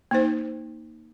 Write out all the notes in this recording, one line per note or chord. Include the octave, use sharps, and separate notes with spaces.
A#3 D#4 C5